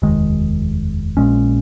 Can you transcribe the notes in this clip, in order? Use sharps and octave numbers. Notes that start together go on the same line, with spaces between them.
F1 D#2 D#3 G#3
A#1 A#2 G#3 C#4